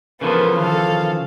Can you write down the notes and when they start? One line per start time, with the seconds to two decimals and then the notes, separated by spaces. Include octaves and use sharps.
0.21 C#3 E3 F3 B3 A4 A#4
0.58 D#3 A4 F5